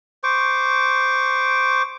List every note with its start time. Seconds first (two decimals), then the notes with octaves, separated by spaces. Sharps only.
0.23 C5 C#6 D6